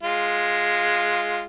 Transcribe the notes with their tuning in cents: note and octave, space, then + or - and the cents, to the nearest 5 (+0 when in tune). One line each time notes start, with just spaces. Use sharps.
G#3 +0 F4 +0